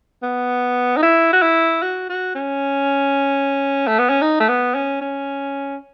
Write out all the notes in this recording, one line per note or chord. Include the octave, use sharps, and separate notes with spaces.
B3
D#4
E4
F#4
E4
F#4
F#4
C#4
A3
B3
C#4
D#4
A3
B3
C#4
C#4